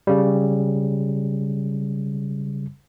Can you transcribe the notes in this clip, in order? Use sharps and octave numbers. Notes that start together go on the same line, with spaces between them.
C#3 G3